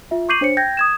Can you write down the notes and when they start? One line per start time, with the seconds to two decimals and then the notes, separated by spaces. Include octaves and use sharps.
0.11 F4 E5
0.29 C#6 D6 G6 C7 D#7 F#7
0.41 D4 C5 C#5 C#7
0.57 G5 G6 G#6 A#6
0.77 D#6 G#6 E7